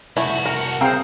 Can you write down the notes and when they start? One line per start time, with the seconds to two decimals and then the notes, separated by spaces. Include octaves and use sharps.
0.17 C2 A3 E4 F#4
0.46 A#4 A5
0.81 C4 G#4 C5 F5 G5 A#5